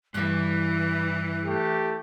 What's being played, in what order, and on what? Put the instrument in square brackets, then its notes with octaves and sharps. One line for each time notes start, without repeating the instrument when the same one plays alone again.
[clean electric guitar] G2 G3 [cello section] E3 [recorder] F#6
[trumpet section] A3 G4